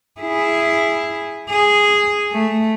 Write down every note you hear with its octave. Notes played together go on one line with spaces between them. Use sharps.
E4 G#4
G#4
A3